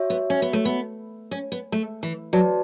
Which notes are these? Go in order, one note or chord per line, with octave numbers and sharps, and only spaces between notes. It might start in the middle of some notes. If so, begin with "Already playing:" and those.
Already playing: F#4 C#5 E5
B3
C#4
B3
A3
B3
C#4
B3
A3
E3
F#3 F#4 B4 D5 A5